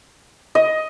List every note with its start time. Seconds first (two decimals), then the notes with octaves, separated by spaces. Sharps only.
0.55 D#5